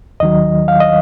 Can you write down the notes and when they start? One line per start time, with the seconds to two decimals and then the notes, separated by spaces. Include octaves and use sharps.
0.20 D#2 D#3 F#3 D#5
0.68 F5
0.80 D#5